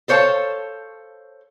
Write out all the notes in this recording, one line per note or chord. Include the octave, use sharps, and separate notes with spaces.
A4 C5 C#5 F5 A5